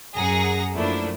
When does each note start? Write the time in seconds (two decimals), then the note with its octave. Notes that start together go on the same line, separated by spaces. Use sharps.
0.15 F#2 G#4 F#5 A#5 A#6
0.74 F#2 F3 A3 A#3 D4 E4